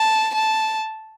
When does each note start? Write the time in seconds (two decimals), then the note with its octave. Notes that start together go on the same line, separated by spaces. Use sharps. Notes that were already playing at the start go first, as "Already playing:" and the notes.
Already playing: A5
0.35 A5